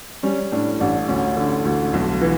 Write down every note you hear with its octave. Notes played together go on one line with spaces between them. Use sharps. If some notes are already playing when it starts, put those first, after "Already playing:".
G3 C#4
A2 D4
A1 D4
D2 C#4
D3
D2
B1
E3